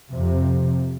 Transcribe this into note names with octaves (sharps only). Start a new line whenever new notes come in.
F2 C3